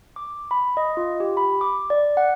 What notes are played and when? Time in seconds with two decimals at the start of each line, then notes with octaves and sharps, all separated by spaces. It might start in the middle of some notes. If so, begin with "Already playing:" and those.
0.16 D6
0.51 B5
0.77 D#5
0.97 F4
1.20 G4
1.37 B5
1.61 D6
1.90 D5
2.17 F#5